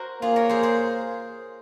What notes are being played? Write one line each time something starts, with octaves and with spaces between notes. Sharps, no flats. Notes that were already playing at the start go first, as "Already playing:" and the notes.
Already playing: F#4 A#4 C5
A#3 F4 G#4
A#4 C#5
G#4 C5
G#4 C5